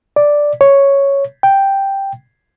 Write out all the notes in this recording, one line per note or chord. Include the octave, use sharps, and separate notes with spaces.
D5
C#5
G5